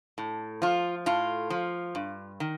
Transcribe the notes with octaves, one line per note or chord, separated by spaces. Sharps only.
A2
F3 F4
A2 F4
F3
G2
D#3